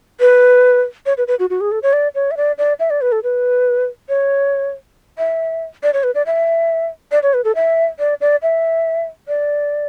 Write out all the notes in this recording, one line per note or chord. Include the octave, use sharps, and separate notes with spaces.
B4
C#5
B4
B4
F#4
F#4
G#4
A4
C#5
D5
C#5
E5
D5
D5
E5
D5
B4
A4
B4
C#5
E5
D5
C#5
B4
D5
E5
D5
C#5
B4
A4
E5
D5
D5
E5
D5